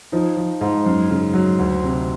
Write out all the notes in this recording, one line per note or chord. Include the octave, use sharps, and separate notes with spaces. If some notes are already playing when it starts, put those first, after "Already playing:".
F3 D#4
F3
G#2
F#2
C#3
F#3
D2
C3